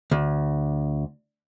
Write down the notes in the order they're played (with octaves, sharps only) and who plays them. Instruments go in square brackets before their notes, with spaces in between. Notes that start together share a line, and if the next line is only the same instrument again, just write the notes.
[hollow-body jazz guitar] D2